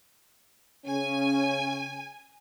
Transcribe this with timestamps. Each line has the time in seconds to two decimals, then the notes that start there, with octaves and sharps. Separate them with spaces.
0.86 C#3 C#4 G#5